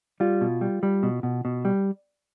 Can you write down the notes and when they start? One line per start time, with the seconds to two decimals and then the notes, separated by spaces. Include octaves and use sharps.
0.20 G3 F4
0.41 B2
0.61 G3
0.83 G3
1.03 B2
1.23 B2
1.45 B2
1.65 G3